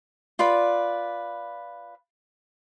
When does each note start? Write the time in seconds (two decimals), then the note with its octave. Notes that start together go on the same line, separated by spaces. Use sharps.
0.39 F4 B4 D5 B5